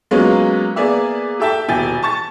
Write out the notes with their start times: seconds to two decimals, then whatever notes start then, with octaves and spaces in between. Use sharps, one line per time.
0.11 F#3 G#3 A#3 B3 C#4 F4
0.76 A#3 B3 G#4 D5 E5
1.40 G4 A4 E5 G5 A5
1.69 D#1 B2 E4 G5 G#5 A6
2.03 A5 C#6 A6